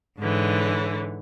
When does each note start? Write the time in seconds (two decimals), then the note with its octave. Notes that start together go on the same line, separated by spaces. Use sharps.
0.19 G#2 D3 E3 C#5